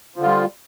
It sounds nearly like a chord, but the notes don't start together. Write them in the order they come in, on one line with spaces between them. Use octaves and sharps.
F3 D3 F4 G3